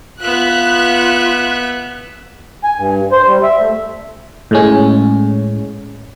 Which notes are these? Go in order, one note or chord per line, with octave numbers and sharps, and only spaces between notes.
B3 F4 E5 F#6
G#5
G2
C5
G3
E5
A3
A2 G#3 C#4